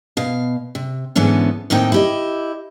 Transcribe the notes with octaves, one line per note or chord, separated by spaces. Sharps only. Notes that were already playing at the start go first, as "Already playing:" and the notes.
B2 F5
C3
G#2 D3 E3 B3 C#4 A4
D#2 A2 C4 D#4 G5
E4 G4 D#5